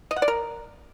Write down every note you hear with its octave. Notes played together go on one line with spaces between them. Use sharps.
D#5
F#5
D5
A#4